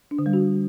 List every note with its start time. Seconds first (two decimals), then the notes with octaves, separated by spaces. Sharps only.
0.11 D4
0.19 D3
0.26 G3
0.33 F#4